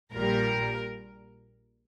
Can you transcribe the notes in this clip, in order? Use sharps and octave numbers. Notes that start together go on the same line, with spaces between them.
A#1 A#2 G3 A#4